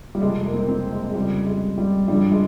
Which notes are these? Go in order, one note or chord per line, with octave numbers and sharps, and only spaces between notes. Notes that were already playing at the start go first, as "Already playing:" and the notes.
G3
F2 C3 F3 G#3
A#3
C4
A#3
C4
G#3
G#3
F2 C#3 F3 G3
G#3
G3
G2 F3 G3
G#3